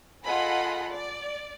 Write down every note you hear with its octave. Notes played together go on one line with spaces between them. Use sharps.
F4 G#4 A4 D#5 F#5 B5
D5